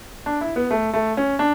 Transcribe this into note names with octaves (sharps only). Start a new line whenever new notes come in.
D4
E4
B3
A3
A3
C#4
D4